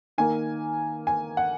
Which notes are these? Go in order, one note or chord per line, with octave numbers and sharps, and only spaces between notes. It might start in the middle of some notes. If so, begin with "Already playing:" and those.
D#3 A#3 G#5
G#5
F#5